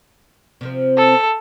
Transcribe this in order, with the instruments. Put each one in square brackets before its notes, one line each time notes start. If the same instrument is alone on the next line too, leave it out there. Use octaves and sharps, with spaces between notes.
[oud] C3 F3 C4
[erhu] A4